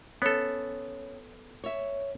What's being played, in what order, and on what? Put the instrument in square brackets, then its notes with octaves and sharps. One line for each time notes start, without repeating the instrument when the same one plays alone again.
[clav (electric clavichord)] B3 A4 [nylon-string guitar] C#4
[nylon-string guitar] C#5 E5